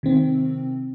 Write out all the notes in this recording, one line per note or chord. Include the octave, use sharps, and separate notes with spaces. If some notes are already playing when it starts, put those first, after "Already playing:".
C3 D#3 C4